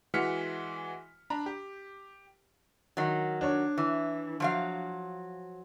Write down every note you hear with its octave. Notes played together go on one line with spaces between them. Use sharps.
E3 G#3 F#4 F6 B6 C#7
D4 A#5 B5
G4
D#3 F#3
D4 C#5
E3
F3 F#3 F5